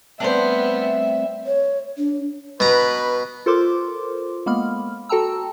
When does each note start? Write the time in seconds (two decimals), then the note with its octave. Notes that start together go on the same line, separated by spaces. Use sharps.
0.20 G3 A3 B3 C4 D4 C5 E5
1.46 C#5
1.98 D4
2.60 B2 B4 A#5
3.46 F4 A4 A#4 C5 C6 D6
4.46 G#3 A#3 B3 B5 F6
5.09 F#4 A4 G5 A5 A#5 E6